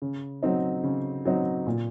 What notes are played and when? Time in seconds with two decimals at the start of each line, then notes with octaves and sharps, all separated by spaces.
0.02 C#3
0.43 F#3 C4 D#4
0.83 C#3
1.25 F#3 C4 D#4
1.67 A#2